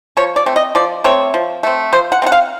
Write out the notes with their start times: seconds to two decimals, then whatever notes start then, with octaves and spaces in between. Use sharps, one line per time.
0.17 F3 C#5
0.36 D5
0.46 A3 C4
0.56 D#5
0.75 F3 D5
1.04 A3 C4 C#5
1.34 F3
1.63 A3 C4
1.92 F3 C5
2.12 F#5
2.22 A3 C4
2.26 F#5
2.32 F5